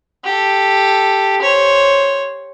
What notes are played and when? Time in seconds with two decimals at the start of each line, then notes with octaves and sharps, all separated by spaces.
0.24 G4 A4
1.41 C5 C#5